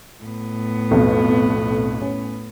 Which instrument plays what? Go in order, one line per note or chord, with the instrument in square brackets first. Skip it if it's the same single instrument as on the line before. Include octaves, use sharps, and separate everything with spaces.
[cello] A2 B3
[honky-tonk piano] B1 F2 B2
C#4